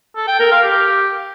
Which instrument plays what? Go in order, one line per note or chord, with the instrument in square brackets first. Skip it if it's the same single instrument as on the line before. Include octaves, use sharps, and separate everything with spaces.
[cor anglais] A4
G5
A#4
F5
G4